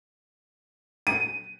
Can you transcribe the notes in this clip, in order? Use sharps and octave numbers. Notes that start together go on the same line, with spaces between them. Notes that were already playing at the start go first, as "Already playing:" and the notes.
D#7